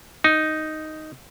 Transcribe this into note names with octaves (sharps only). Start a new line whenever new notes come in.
D#4